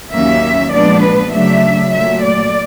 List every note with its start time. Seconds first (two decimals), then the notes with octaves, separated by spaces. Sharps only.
0.12 D#2 D#3 F#3 A#3 C#4 E5
0.72 A#2 F3 G#3 B3 D4 D5
1.02 B4
1.32 C#3 F#3 A3 D4 E5
1.93 A#2 F#3 A3 E5
2.23 D5